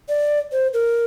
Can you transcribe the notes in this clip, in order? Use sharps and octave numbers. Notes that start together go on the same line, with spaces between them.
D5
C5
A#4